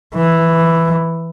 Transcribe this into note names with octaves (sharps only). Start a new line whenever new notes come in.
E3